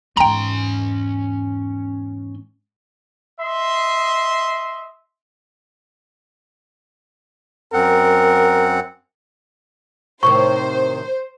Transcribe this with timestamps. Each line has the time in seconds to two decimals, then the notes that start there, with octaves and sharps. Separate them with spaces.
0.17 E2 G#2 C#4 G5 A#5 C6
3.40 D#5 E5 C6
7.73 F#2 C4 A#4 F#5
10.23 A2 C3 D#3 C5 C#6